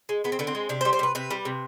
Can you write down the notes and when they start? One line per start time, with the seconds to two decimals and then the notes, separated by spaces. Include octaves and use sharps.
0.09 G#3
0.24 G#3 B3
0.32 C4
0.39 D3 B3
0.47 C4
0.55 G#3
0.69 C3 D4
0.81 C5
0.85 G3
0.93 C5
0.99 C3 B4
1.15 C3 B4
1.31 G3
1.45 C3